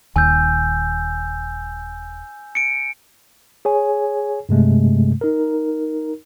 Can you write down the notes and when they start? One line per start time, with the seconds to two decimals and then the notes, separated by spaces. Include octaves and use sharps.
0.16 D#1 D#2 G#5 E6 G6
2.55 C#7 D7
3.65 G#4 C#5 G#5
4.49 G2 C3 G#3 A3
5.21 D#4 A#4